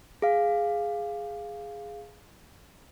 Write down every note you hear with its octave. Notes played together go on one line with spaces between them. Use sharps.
G#4 F5